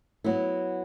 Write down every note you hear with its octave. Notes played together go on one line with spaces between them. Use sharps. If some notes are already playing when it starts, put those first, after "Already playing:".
F#3 B3 E4